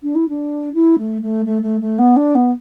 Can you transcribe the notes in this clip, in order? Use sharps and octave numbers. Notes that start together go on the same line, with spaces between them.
D4
E4
D4
E4
A3
A3
A3
A3
A3
B3
D4
B3